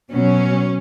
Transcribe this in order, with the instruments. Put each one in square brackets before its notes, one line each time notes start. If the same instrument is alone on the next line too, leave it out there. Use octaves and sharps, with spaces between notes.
[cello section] B2 F#3 C#4